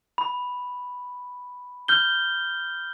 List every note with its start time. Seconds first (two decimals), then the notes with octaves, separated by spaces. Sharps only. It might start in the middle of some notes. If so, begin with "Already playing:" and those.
0.18 B5
1.88 F6 G6 G7